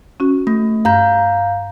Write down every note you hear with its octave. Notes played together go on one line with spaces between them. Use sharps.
C#4 F#4
A3
G2 F5 A#5 G6